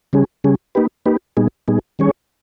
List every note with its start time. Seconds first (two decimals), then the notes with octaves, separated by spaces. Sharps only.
0.13 C#3 G3 C#4 G#4
0.44 C#3 G3 C#4 G#4
0.75 A#3 D#4 G4 B4
1.06 A#3 D#4 G4 B4
1.37 A#2 G3 B3 D#4 G#4
1.68 A#2 G3 B3 D#4 G#4
1.99 D#3 G3 C#4 G#4 C#5